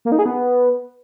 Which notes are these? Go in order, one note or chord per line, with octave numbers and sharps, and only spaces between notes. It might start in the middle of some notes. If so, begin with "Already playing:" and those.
A#3
D#4
G#4
B3